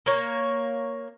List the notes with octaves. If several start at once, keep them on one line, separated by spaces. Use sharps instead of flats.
A#3 C#5